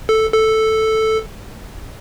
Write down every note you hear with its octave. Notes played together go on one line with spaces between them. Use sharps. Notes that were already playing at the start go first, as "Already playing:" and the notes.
A4
A4